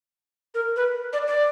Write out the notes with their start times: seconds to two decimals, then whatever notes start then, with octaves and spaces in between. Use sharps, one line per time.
0.55 A#4
0.76 B4
1.13 D5
1.27 D5